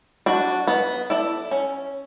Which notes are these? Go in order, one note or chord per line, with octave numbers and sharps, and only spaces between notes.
D4 F#4
B3
E4 A4 D5
C#4